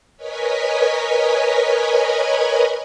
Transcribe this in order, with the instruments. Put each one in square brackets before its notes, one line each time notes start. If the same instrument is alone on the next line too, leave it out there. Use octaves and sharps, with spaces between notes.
[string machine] A#4 B4 C#5 D#5 G#5 B5